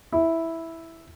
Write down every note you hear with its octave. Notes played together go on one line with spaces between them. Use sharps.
E4